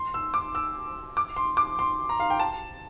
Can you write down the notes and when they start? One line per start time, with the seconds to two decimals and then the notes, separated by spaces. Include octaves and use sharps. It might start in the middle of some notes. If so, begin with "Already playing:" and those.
Already playing: C6
0.14 E6
0.34 D6
0.55 E6
1.17 D6
1.36 C6
1.57 D6
1.79 C6
2.09 A#5
2.20 F5
2.30 G5
2.40 A5